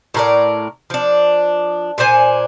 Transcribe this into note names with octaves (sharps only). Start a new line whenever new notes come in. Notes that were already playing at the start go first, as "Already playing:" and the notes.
A2 A#4 D5
F3 D4
A#2 D4 C5 G#5